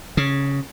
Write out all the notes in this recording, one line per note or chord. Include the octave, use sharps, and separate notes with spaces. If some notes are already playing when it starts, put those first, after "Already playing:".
C#3